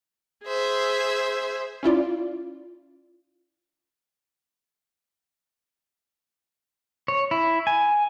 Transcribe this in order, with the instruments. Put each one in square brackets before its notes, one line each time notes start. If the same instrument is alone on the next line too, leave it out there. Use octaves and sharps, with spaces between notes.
[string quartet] G#4 C5 E5
[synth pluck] C#4 E4 F4 D5
[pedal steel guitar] C#5
E4
G#5